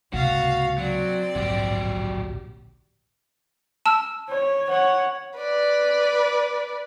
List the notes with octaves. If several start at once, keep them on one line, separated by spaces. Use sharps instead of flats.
C#2 G#2 C3 A#3 F#4 F5 A6
F#3 C4 D5
D1 A#1 G#2 F#3 G4
A5 E6 F6
C#5
C#5 F#5
B4 D5